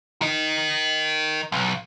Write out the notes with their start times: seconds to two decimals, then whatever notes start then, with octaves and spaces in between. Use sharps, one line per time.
0.22 A#4 D#5
1.52 B1